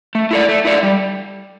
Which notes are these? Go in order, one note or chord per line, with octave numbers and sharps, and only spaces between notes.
A3
E4 A4 D5
A3
E4 A4 D5
G3